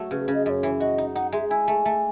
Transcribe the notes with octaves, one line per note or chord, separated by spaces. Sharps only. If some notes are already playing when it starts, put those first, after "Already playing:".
Already playing: F#3 A3
C#3 B4
C#3
D#5
F#2 C#5 D#5
E3
F#4 D#5
D#4
D#4 F#5
G#3 E5
E4 G#5
A3
A3